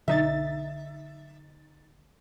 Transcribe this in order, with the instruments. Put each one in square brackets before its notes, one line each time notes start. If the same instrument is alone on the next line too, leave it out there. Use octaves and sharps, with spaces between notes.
[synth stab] B1 D#4 A6 [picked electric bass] D3 [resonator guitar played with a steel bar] E5